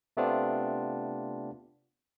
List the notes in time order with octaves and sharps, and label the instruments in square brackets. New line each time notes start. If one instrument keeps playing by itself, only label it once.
[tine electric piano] C3 A3 B3 C4 D4 F4